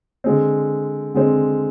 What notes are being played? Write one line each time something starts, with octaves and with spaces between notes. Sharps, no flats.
D3 G#3 C4
D3 G#3 C4